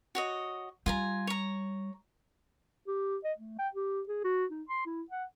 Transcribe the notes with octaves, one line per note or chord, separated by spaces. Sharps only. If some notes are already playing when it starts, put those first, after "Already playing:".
F#4 C#5 D#5
G3 F4 G#5 A#5
C#5 A#5
G4
D#5
A3
G5
G4
G#4
F#4
D#4
C6
E4
F#5